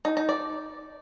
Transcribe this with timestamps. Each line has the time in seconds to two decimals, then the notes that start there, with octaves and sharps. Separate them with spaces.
0.05 D#4
0.17 D#4
0.29 D5